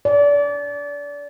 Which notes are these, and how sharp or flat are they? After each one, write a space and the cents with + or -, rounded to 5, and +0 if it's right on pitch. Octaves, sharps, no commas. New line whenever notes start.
D5 -30